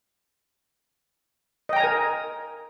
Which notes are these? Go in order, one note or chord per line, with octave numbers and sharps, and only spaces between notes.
A#4 D#5 G5 G#5 A#5